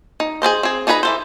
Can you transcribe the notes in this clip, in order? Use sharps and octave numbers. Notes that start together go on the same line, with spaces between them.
D#4
G#4 A4 C5 D#5
C4 G#4
D4 D#4 G#4 B4 A#5
E3 A4 C5